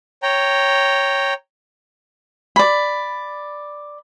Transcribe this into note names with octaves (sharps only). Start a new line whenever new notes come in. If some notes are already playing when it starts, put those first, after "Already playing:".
C#5 G5 A#5
D5 B5